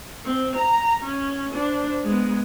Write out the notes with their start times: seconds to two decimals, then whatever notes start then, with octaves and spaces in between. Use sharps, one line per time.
0.24 C4
0.56 A#5
1.04 C#4
1.53 D4 C5
2.04 G#3 B3